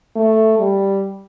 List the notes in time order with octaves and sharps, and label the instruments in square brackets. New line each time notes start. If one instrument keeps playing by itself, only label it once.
[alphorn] A3
G3